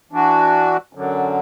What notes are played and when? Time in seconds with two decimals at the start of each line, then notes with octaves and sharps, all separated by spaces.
0.11 E3 D4 F#4
0.93 F#2 D3 F#3